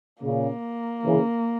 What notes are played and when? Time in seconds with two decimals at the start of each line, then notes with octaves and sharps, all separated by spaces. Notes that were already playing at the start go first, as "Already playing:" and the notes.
0.23 A#2 C#3 A#3
1.06 C#3 E3